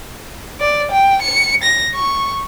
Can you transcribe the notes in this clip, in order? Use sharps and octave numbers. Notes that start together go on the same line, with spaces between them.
D5
G5
C#7
A#6
C#6